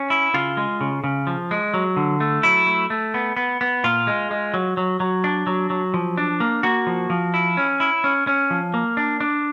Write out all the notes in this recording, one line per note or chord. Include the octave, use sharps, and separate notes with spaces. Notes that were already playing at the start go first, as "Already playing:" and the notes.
Already playing: C#4
E4
C#3 F4
G#3
C#3
C#3
F3
G#3
F#3
D3
A3
F#3 E4
A3
A3
B3
B3
B3
A#2 F4
G#3
G#3
F#3
F#3
F#3
D4
F#3
F#3
F3
D4
A#3
A#3 F#4
F3
F3
E4
C#4
E4
C#4
C#4
F3
A#3
D4
D4